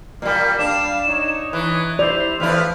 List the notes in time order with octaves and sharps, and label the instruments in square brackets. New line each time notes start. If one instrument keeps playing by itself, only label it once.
[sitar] A#2 G3 [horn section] A#3
[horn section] G3 F5 [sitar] D4 [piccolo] E7
[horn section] D#4 C#5
[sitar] E3 [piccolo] F#6
[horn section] E4 C5 [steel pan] D5 [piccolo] F7
[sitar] E2 F3 E4 [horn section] A3 B4 [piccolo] F6